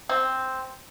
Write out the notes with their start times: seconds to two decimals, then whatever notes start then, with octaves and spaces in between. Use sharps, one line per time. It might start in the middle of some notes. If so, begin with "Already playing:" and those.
0.09 C4